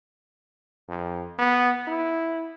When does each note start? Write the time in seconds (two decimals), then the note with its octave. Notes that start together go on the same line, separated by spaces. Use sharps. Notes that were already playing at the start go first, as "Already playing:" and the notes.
0.89 F2
1.39 B3
1.87 E4